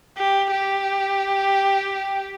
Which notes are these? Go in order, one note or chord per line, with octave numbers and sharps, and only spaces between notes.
G4
G4